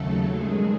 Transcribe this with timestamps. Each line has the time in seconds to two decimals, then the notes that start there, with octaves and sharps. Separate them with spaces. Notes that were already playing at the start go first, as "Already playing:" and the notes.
Already playing: D#2 C#3 F#3 A3 A4
0.25 G2 D#3 G#3 G#4